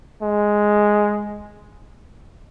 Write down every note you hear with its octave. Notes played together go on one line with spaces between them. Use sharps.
G#3